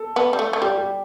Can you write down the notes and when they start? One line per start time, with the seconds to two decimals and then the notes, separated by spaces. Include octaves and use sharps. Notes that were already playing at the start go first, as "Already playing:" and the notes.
Already playing: A4
0.16 B3
0.33 G3
0.39 A3
0.53 A3
0.62 G3 G4
0.78 G4